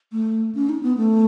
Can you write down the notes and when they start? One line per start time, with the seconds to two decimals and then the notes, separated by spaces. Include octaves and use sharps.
0.12 A3
0.55 C#4
0.69 D#4
0.83 B3
0.97 A3